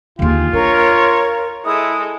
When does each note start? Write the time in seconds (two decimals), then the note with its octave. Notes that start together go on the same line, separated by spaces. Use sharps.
0.19 D#2 D3 F4 G4 G#4
0.53 D4 A#4 C#5
1.65 G#3 E4 A4 D#6